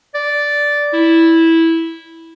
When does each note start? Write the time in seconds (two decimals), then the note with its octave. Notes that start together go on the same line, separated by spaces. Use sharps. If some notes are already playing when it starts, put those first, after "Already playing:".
0.14 D5
0.93 E4